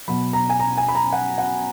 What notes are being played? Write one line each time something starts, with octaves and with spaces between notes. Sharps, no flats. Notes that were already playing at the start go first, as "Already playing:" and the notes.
B2 F#3 B5
A#5
G#5
A#5
G#5
B5
A#5
F#5
F#5